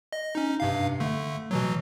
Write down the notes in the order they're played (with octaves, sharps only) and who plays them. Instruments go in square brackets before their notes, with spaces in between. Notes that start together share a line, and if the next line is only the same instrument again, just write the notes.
[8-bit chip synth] D#5
C#4 D#4
G2 C3 F5
D3 A3
B2 E3 F#3